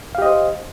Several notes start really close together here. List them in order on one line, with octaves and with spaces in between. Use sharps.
F5 G4 D#5 C5